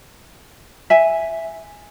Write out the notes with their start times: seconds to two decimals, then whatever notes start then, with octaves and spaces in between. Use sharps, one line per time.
0.90 E5 G#5